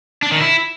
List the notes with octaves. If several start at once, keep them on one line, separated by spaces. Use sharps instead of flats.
D4
D#3
E4